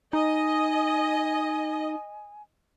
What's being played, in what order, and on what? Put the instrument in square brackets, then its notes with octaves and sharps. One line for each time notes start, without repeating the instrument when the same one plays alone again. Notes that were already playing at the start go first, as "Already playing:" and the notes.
[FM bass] D#4 [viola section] D#5 [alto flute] G#5